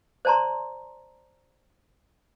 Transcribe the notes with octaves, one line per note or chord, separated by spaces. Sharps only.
C5 D5 A5 A#5 C6